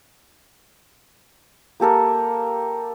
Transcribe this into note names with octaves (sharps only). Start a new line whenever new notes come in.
A#3 G4 A4 A#4